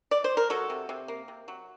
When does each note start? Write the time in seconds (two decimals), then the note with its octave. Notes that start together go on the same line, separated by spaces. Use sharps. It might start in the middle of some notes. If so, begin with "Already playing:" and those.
0.11 D5
0.24 C5
0.37 A#4
0.50 F#3 F#4 A4
0.70 C3
0.89 C3
1.08 A#3
1.28 C3
1.48 F#3